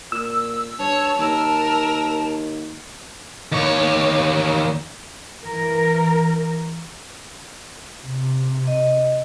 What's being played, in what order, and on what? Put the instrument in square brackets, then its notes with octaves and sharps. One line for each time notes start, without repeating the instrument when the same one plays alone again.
[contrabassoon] A#2 [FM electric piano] E6
[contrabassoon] G2 [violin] C#5 [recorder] A5
[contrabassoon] D#2 [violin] A#4
[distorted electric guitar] D#2 C#5
[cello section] E3 A#4
[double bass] C3
[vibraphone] D#5